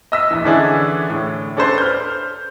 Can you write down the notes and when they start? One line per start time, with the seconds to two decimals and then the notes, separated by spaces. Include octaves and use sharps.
0.12 D#5 E6 B6
0.31 A#1 E3
0.45 D3 E3 C#4 D4 E4 G#4
1.10 A2
1.57 C#4 D4 A4 B4 C5
1.78 F6 G6